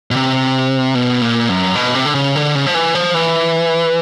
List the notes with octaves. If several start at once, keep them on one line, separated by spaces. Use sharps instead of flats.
B2
C3
B2
A#2
F#2
B2
C3
D3
C#3
D3
C#3
F3
E3
F3
E3